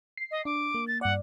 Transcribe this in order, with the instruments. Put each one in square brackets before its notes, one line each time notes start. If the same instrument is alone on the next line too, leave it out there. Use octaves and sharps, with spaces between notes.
[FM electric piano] C7
[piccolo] D#5
[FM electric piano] D4 [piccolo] D6
[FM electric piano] A#3
[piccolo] A6
[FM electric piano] G2 D5 [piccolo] F#5